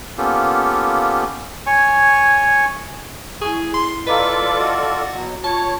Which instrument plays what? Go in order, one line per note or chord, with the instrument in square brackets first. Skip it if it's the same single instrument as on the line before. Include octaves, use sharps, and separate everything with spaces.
[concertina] A#3 B3 C#4 F4 G4 A4
[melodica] C#5 G#5 C#6
[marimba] E4 G#5 C#6 [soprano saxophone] G#4
[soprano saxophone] C6
[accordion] F4 A4 D5 [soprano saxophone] B4 [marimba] D#5 F5 A#5
[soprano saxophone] F#4 [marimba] D#5
[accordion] B2 F#3
[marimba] F4 [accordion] C#5 [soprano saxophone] A5